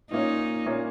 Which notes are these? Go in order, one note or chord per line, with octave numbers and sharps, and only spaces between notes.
A#2 A#3 C#4 D#4
A#2 A#3 C#4